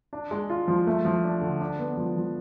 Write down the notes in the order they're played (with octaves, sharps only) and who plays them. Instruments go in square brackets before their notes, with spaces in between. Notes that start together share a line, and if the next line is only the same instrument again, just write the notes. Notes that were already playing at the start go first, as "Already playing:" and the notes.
[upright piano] D4
G#3
F4
F3
A3
F3
D4
D3
D4
B3
F3
F3